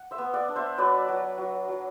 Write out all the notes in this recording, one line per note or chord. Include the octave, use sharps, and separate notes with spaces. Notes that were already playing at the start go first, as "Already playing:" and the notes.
Already playing: F#5
C5 E5
B3
D5 F#5
D4
C5 E5
F#3 B4 D5
F#3
F#3
F#3